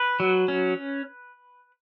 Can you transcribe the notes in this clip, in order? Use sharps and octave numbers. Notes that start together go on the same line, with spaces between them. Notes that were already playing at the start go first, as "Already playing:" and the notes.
Already playing: B4
F#3
C#4